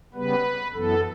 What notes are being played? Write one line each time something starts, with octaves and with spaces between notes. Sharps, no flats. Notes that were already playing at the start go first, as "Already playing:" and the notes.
C#3 G3 B3 B4
F#2 E3 B3 A4